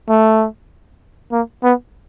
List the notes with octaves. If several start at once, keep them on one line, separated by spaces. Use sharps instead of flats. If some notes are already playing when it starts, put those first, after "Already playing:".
A3
A#3
B3